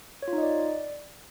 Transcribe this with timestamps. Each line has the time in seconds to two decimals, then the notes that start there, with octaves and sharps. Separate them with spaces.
0.22 C#5
0.28 F4
0.33 D#4
0.38 D#5
0.43 D5